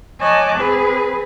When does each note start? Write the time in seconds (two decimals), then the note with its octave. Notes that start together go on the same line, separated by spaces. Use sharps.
0.20 C#5 D#5 G#5 A5 D6 F#6
0.55 C4 G#4 B4